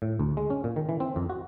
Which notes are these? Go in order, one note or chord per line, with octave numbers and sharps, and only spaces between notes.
A2
D2
G#3
C#4
A#2
D#3
E3
C4
F2
F#4